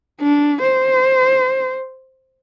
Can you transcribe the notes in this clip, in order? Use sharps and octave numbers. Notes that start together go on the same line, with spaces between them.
D4
C5